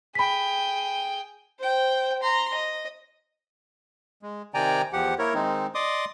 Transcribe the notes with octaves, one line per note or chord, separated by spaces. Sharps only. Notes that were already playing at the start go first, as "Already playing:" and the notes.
G#4 G5 B5 B6
C5 G5
A#5 C6
D#5
G#3
C3 D#3 D5 G5 G#5 A#5
E2 F3 G4 F#5
A#3 E4 A#4 C#5
D#3 G#3 C4 D#4
D5 D#5 C6 D6 D#6